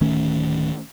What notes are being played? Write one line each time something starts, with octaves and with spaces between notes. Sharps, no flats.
D1 D#3 A3 C#4